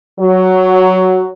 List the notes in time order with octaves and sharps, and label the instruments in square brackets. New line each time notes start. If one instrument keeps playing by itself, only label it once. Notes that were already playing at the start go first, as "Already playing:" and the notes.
[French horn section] F#3